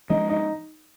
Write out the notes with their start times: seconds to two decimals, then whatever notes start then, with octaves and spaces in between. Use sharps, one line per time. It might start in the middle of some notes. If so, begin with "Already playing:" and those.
0.09 F3 G#3 C#4 D#4 D#5
0.29 D#4 D#5